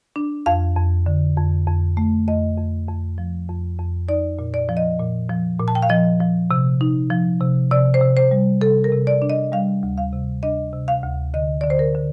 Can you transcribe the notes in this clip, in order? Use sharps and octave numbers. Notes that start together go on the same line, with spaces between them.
D4
F2 F5
F2
D3
F2
F2
A3
F2 D#5
F2
F2
F3
F2
F2
D#4 D5
A#2
D5
F3
D#5
A#2
F3
A#2
A5
G5
F5
F3 D#5
F3
C3
D#4
F3
C3
C3 D5
C5
C3
C5
G3
C3 A4
A#4
C3
D5
D4
D#5
G3 F5
D2
F5
C3
D4 D#5
C3
F5
D2
D3 D#5
D3 D5
C5
A#4
D3